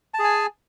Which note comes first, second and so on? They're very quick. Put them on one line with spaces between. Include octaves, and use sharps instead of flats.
A5 G#4 G#5